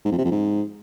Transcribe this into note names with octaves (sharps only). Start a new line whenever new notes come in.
G#2
F2
C3
F2
G#2